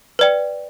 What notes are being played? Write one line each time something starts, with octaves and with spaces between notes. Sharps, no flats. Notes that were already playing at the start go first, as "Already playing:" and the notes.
B4 D5 G5